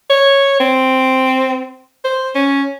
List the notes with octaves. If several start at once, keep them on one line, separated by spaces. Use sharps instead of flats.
C#5
C4
C5
C#4